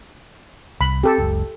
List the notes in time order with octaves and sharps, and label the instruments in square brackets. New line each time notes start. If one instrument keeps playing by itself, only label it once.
[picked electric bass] C2 [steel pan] B5
[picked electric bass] C4 [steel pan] G4 A4
[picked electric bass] F#1 C#2